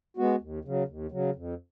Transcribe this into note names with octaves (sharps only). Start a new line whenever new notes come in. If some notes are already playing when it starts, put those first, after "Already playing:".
G#3 B3 F#4
D#2
C#3 F#3
D#2
C#3 F#3
F2